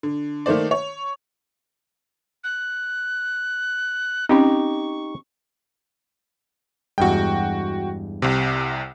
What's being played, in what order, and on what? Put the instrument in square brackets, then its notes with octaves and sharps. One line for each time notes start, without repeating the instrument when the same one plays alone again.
[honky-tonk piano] D3
D#3 A3 A#3 C5 D5
C#5
[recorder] F#6
[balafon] C4 C#4 [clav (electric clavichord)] D#4 G4 [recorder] C#6
[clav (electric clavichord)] E2 G2 G#3 [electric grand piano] F#4 G5
[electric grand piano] C2 C3